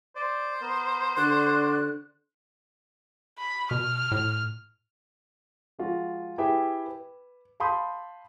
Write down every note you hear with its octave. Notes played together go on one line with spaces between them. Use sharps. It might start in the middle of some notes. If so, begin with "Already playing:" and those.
C5 D5
B3 A#4
D3 F#4 D5 F#6
B5
B2 F6
A2
F3 G#3 F4 F#4
E4 G4 G#4 B4 E5 G5
B4
F5 A5 B5 C6 D#6 G6